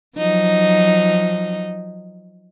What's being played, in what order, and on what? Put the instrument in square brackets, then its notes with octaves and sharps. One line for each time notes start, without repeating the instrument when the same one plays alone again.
[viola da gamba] F3 F#3 D#4